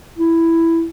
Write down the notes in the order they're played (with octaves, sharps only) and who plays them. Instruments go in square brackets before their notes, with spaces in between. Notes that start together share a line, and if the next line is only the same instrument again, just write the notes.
[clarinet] E4